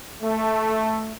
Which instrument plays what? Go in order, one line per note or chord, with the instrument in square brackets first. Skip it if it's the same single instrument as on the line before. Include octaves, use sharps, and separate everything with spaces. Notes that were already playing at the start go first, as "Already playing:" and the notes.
[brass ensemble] A3